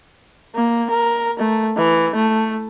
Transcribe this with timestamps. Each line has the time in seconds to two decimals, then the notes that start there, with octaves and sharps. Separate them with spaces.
0.56 A#3
0.91 A#4
1.39 A3
1.78 E3
2.16 A3